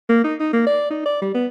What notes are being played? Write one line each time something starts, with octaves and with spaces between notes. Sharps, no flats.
A#3
D#4
D#4
A#3
D5
D#4
D5
G3
B3